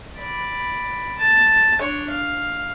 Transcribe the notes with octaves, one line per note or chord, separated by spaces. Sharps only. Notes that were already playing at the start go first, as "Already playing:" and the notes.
D5 B5
A5
D4 C#5
F5